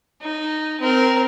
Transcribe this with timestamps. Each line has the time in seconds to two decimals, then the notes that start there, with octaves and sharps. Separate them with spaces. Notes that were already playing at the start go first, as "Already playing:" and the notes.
0.22 D#4
0.81 C4 A#4